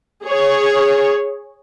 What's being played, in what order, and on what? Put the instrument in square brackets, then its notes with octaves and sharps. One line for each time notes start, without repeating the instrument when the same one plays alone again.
[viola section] G#4 C#5